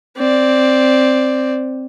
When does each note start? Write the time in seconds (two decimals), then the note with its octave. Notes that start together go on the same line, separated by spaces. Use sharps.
0.17 C4 D5